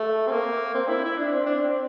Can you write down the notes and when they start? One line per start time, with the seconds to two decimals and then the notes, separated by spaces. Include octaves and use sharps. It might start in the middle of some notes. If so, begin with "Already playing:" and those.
Already playing: A3
0.27 C4
0.31 A#3
0.74 C4
0.88 E4
1.04 E4
1.18 D4
1.33 C4
1.46 D4
1.61 C4